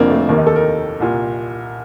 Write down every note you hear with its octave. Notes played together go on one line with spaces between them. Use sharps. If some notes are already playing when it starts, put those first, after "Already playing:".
Already playing: F1 F2 D3 A#3 C4 D4 F4
A3
D#2 D#3 A#3
D#4
A4
A#4
C2 A#2